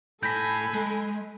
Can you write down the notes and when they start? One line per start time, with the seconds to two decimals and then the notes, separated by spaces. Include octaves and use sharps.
0.23 A2 A4 G#5 A5 B5 G6 A#6 B6
0.74 G#3